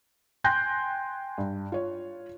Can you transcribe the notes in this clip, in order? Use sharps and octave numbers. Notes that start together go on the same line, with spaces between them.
G5 G#5 C6 F#6 G6 A#6
G2
F4 C#5